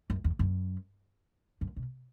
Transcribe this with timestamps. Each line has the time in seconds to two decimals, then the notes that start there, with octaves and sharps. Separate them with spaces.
0.10 F#2
0.24 E2
0.39 F#2
1.61 F#2
1.76 B2